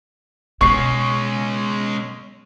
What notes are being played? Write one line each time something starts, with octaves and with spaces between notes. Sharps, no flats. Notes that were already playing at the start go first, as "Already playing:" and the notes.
B2 G#3 C#4 C#6 C7